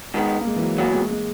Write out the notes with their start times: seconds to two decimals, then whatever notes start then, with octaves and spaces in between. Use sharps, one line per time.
0.14 G#2 D#3 G#3 B3
0.41 A#3
0.47 G#3
0.56 E3
0.62 F#3
0.78 E2 B2 F#3 A#3
0.94 G#3
1.10 G#3